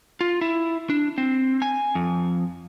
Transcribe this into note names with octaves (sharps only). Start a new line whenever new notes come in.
F4
E4
D4
C4
G#5
F2